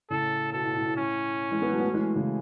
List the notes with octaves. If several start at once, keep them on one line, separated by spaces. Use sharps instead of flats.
A2 C#3 A4
B2 A4
A2
A2
A2
C#4
E3 G#3
G#3 B3
F#3 A3
B3
F#3 A3
E3 G#3
C#3 E3